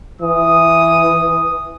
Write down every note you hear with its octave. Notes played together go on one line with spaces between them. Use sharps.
E3 D#6